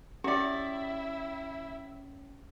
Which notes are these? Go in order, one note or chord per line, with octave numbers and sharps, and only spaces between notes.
C#4 E4 F#4 G4 D5 E5